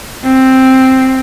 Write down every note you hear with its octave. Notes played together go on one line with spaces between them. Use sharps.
C4